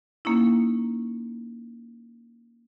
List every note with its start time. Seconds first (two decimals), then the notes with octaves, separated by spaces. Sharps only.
0.25 A#3 C#4 D#4 E4